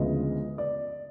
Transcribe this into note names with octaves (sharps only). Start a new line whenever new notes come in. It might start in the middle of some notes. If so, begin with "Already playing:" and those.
Already playing: D2 C#3 F3 G#3 B3 D#5
D5